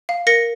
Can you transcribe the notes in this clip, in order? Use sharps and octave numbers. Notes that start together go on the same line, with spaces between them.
F5
A#4 A#6 C#7